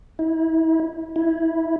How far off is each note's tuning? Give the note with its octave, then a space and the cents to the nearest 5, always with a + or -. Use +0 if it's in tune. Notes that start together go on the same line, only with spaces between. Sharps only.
E4 -35
E4 -10